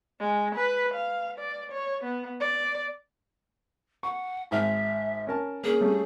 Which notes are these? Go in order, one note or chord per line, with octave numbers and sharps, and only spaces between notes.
G#3
B4
F5
D5
C#5
B3
D5
F#5 C#6
G#1 G#2 E5 F6
C#4 A#4 A5
A#3 C#4 G#4
G3 A3 C#4